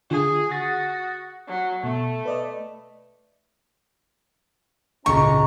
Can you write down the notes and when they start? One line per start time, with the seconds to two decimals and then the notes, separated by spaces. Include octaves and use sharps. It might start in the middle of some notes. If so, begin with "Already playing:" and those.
0.11 D3 F4 G#4
0.51 F#4 D#6 A6 A#6
1.48 F#3 C#6
1.84 B2 A3
2.25 B4 D5 D#5
5.06 G#1 C#2 A#2 C#4 D#5 A#5 C#6